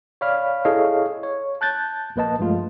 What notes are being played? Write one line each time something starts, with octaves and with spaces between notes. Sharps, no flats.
C#5 D5 F5 B5 F6
E4 G#4 A4 C#5 D#5 F5
C#5
A5 F#6 G6 A6
A#1 A#3 B4 D#5 A5
G2 F3 G#3 A3 F4